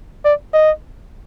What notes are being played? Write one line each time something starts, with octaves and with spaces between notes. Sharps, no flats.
D5
D#5